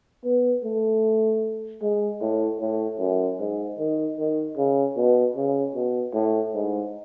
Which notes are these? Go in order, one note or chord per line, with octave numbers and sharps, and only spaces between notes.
B3
A3
G#3
A2
A2
F#2
G#2
D#3
D#3
C#3
B2
C#3
B2
A2
G#2